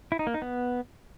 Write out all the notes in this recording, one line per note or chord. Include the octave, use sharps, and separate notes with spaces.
E4
D#4
A#3
D#4
B3